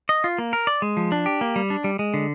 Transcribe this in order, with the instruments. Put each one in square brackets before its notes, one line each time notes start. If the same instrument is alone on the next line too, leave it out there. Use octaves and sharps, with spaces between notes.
[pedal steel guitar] D#5
F4
A#3
A#4
D5
G#3
F3
D4
G4
A#3
G3
D4
G3
G#3
D3